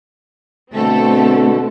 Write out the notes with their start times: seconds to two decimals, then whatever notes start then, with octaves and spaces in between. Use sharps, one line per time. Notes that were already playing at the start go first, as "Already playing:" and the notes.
0.74 B2 D3 A3 C4 A4